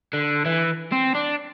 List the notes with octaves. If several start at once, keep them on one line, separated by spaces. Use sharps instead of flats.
D3
E3
C4
D4